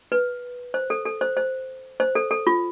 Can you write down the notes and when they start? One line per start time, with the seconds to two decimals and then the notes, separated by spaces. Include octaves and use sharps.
0.12 B4
0.74 C5
0.90 A4
1.05 A4
1.21 C5
1.37 C5
2.00 C5
2.15 A4
2.31 A4
2.47 F4